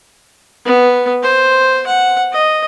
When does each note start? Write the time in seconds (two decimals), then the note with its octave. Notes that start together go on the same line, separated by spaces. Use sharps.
0.65 B3
1.23 C5
1.87 F#5
2.32 D#5